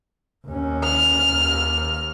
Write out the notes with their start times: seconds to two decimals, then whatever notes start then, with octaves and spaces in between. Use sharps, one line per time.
0.47 D#2 C#4
0.84 F6
1.33 D#2